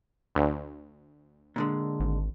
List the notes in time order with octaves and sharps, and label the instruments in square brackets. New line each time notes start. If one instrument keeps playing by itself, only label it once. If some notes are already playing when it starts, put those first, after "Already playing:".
[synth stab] D2
[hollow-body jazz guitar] A#2 D3 G#3
[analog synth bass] G#1